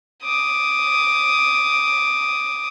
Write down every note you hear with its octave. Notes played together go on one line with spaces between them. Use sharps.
D6 D#6